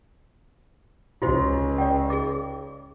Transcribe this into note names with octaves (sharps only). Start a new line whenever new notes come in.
C#2 F4 F#4 C5
D5 G5
G#4 D6